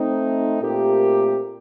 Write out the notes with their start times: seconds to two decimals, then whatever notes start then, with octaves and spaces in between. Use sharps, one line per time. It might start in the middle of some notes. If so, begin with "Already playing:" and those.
Already playing: A3 C4 D#4
0.59 A#2 A3 C4 G4 A#4